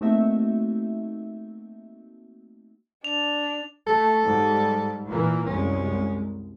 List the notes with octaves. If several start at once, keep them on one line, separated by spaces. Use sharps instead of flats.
A3 A#3 C4 D#4 F#4 E5
D4 F7
A3 A4
G#2 G3
A#2 E3 A#3
C2 F#2 G#3 C#4